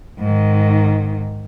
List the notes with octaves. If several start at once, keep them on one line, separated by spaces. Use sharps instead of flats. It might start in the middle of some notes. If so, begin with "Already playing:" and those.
G#2 D#3